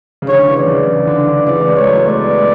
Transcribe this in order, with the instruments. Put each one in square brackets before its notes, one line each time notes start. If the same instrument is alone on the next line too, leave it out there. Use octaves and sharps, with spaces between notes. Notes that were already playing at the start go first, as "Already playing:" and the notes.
[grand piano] C#3
[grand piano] D3 [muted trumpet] C#5
[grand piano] C#3 E3
[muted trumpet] D5
[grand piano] C#3 E3
C#3
D3
D3
[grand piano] C#3 E3 [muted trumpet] D5
[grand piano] E3 G#3
[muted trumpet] C#5
[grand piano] F#3 A3
[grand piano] G#3 B3 [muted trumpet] D5
[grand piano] G#3 B3